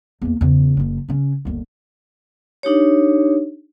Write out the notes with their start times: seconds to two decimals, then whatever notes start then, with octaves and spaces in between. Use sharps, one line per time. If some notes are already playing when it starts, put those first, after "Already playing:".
0.22 E2 A#3
0.41 E2 C#3
0.77 F#1 F3
1.09 C#3 C#4
1.45 G1 D#2
2.63 D4 D#4 G4 C#5